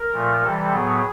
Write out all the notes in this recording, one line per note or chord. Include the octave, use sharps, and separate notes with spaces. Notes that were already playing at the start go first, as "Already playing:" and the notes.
Already playing: A#4
A#2 F3 A3
C3 E3 G3 A4
A2 F#3 B3 G#4